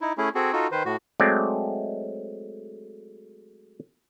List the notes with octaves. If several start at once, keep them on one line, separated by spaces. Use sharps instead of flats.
D#4 E4
A3 C#4 E4 G#4
C4 F#4 G#4 A4
D#4 F4 F#4 A4
D#3 B4 C5
A2 F#4
F#3 G#3 A3 C4 D5